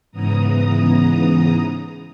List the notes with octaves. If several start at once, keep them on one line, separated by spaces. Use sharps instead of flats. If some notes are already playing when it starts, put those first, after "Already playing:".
G#2 C#3 E3 B3 A#5 D#6